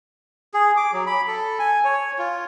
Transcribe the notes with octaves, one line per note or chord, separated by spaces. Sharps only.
G#4
D6
F#3
B5
A4
G#5
C#5
F4